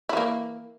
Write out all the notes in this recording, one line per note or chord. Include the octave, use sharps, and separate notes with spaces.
E3 A#3 E4